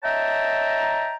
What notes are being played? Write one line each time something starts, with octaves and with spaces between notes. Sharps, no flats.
C#5 D#5 E5 G5 A5 A#5